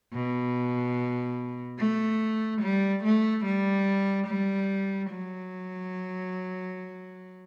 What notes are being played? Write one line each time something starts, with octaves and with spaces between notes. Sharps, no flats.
B2
A3
G3
A3
G3
G3
F#3